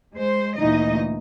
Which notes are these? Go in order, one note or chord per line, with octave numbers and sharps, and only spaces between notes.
G#3 C5
D2 A#2 E3 D#4 D#5